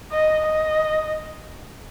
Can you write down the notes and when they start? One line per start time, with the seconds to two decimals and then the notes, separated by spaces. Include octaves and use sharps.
0.12 D#5
0.46 D#5